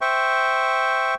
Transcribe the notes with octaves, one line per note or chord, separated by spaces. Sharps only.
C5 E5 G5 C#6